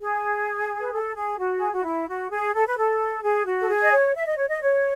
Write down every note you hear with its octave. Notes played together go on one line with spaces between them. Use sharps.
G#4
B4
A4
G#4
F#4
G#4
F#4
E4
F#4
G#4
A4
B4
A4
G#4
F#4
A4
G#4
D#5
C#5
E5
D#5
C#5
D#5
C#5